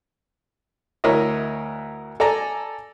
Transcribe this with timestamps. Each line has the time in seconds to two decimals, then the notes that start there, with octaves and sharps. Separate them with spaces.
1.04 D2 E4 A#4 C#5 D#5
2.20 A4 D5 G#5 A#5